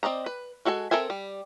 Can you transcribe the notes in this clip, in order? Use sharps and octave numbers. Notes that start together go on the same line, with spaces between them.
C4 D5 D#5 A#5
B4
G#3 F#4 A4 G#5
C4 A4 A#4 E5 G#5
G3